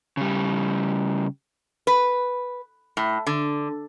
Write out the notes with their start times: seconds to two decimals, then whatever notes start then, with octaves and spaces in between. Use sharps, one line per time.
0.17 C#3 G3
1.87 B4
2.97 A2
3.27 D3